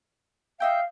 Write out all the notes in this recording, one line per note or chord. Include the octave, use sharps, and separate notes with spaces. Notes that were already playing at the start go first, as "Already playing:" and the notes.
D#4 E5 F5 G5